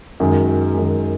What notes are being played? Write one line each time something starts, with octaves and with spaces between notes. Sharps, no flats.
F#2 D#3 G#3
F#2 D#3 G#3